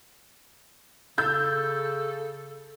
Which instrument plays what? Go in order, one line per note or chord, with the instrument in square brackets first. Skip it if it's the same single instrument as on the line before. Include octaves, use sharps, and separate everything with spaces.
[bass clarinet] C#3 [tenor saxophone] A4 [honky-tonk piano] E6 G6 A6